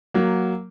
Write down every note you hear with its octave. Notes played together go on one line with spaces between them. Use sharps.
F#3 A#3